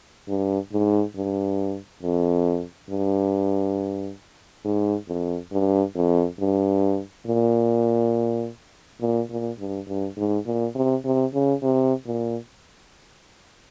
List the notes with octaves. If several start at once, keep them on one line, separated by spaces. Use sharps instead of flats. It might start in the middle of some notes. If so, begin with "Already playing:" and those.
G2
G#2
G2
F2
G2
G#2
F2
G2
F2
G2
A#2
A#2
A#2
G2
G2
G#2
A#2
C3
C3
C#3
C3
A#2